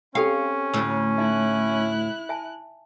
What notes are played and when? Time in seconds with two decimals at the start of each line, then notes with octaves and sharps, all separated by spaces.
0.15 C4 C#4 G4 A4 F5 G5
0.73 D2 A2 C#6 E6
1.18 D#4 E4 E5 F#6
2.29 E5 G#5 A5